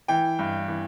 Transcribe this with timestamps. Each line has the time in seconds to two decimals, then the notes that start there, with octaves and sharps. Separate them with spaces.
0.08 E3 G5
0.39 G2
0.68 E3